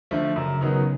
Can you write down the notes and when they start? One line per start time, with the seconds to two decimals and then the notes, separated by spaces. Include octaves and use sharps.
0.11 D3 F3 A3
0.36 F#2 C#3
0.61 D#3 F#3 B3 D#4